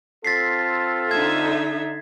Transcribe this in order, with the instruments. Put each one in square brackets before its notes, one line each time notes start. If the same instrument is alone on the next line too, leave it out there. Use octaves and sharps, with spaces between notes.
[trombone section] C4 F4 A4 [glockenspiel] A6 B6 C7
[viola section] D3 D#4 E5 [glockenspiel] G#6